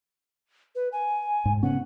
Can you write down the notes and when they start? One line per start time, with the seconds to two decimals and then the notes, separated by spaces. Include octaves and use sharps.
0.75 B4
0.92 G#5
1.45 G#2
1.63 C#3 B3 C#4 F#5